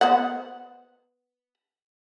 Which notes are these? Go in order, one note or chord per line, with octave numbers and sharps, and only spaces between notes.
B3 C5 F#5